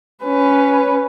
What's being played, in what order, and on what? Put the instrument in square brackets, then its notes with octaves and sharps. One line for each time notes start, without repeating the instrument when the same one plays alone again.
[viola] C#4 B4